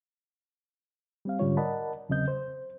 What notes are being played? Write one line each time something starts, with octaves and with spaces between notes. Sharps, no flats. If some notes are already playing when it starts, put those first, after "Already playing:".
G3 C4 F5
G#2 D3 G3 C#4 F4 C#5
A#4 D5 D#5 F#5 A5 B5
E2 C#3 F#3 C4 D#5 G6
C5